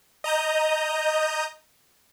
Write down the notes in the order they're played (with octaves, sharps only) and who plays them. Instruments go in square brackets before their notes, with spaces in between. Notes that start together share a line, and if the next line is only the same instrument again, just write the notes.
[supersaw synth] D#5 A#5 D#6 G6